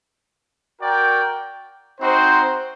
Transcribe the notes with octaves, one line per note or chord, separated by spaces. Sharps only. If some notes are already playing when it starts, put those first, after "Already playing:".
F#4 A#4 D5 G5
C4 D#4 F#4 C5